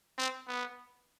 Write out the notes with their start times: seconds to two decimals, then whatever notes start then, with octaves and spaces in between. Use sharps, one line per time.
0.18 C4
0.48 B3